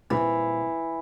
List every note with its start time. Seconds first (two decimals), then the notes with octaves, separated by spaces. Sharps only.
0.10 A#2 E3 G3 C4